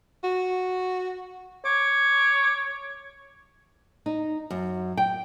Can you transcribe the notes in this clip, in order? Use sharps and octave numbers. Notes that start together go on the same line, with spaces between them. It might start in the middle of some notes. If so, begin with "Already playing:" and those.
F#4
C#5 D6
D#4
F#2
G5